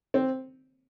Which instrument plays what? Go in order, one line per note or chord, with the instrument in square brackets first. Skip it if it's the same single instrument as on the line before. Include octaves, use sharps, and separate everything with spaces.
[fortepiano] C4